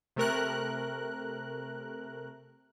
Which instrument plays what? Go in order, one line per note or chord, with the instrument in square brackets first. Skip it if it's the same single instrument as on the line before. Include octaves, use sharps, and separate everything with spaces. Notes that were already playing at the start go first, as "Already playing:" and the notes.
[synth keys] C3 A3 A#4 F#6